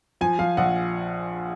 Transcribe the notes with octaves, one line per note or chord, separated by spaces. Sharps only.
F3 G#5
F3 F5
A#1 F#5